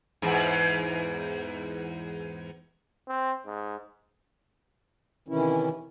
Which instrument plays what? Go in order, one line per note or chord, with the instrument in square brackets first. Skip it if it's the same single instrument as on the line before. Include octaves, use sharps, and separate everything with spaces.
[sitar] E2 G#2
[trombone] C4
G#2
[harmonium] C3 D#3 E3 C#4 E4